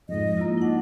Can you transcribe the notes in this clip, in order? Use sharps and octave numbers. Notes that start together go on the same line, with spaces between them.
F2 G#2 D#5
A#3 E4 F4
D4 D#4 F#5